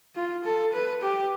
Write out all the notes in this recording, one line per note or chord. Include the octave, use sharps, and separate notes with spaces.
F4
A4
B4
G4